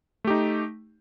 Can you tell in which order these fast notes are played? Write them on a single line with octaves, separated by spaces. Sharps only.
A3 G4 D#4